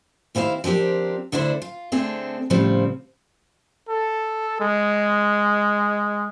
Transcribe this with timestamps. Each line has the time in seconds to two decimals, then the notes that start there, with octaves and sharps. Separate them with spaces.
0.35 D#2 C4 E4 F#4 F5
0.64 F3 C4 D4 G4 A#4
1.32 D2 D3 D4 E4 C5
1.62 F4
1.92 D3 A3 C4 D4 G#4 A4
2.50 A2 C#3 F3 G3 C4
3.89 A4
4.60 G#3